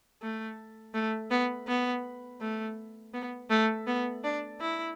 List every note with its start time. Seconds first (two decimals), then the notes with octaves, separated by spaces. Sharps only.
0.22 A3
0.94 A3
1.31 B3
1.68 B3
2.41 A3
3.13 B3
3.50 A3
3.87 B3
4.24 D4
4.60 E4